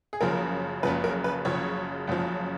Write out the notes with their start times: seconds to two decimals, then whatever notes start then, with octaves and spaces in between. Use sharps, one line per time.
0.13 G#4
0.21 F#1 F#2 C#3 F3 A#4
0.83 F#1 F#2 C#3 F3 B4
1.04 A#4
1.24 B4
1.45 F#1 F#2 C#3 F3 C#5
2.07 F#1 F#2 C#3 F3